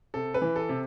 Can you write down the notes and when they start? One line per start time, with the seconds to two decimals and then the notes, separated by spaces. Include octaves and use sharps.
0.14 C3 A4
0.34 B4
0.42 E3
0.56 A4
0.69 C3